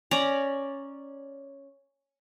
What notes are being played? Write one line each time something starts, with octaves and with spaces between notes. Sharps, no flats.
C#4 D5 A#5